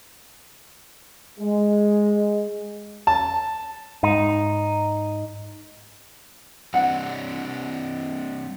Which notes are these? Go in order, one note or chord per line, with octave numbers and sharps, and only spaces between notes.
G#3
A5
G#2 D#4
G3 C4 D4 F#5